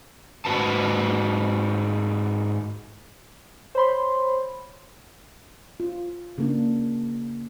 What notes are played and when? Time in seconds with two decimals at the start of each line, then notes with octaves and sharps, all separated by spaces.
0.45 G#2 F#4 B4 A5
3.75 C5 C#5 B5 C6
5.80 F4
6.38 C#3 A#3 D4